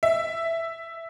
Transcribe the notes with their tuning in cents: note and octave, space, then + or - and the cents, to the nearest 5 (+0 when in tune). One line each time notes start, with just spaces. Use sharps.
E5 +5